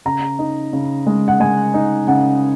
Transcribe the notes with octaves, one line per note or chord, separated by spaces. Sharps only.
C#3 A#5
D#4
C#3
G#3
F#5
G#3 G#5
D#4
C#3 F#5